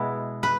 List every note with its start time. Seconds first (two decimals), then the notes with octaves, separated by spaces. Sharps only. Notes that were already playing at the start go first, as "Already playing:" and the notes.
Already playing: B2 G#3 B3 E4
0.43 B4